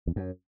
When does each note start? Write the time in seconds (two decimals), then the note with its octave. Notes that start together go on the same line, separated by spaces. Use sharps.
0.07 E2
0.16 F#2